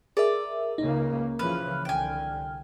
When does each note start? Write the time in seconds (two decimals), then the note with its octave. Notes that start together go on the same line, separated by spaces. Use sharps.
0.17 G#4 A#4 D5 E5
0.78 C#2 C#3 A#3 D#4
1.39 C#3 E3 F3 B4 F6
1.85 C2 D3 G5 G#5